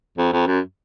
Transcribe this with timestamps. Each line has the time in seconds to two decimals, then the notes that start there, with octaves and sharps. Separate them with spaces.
0.18 F2
0.33 F2
0.47 F#2